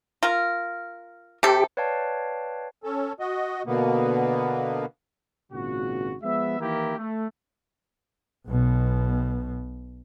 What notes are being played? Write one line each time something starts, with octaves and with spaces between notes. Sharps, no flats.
F4 A#4
C3 G4 A4
B4 C#5 D5 F5 G5 A5
C#4 A4
F#4 D#5
B2 D3 A#3 B3
G#1 A#2 C#3 F#4
F3 G#3 B3 E5
D#3 E3 A#3 E4 G4 A#4
A3
B1 B2